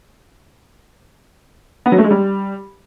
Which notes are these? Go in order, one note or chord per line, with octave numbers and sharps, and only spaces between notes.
B3
F#3
A3
G#3
G3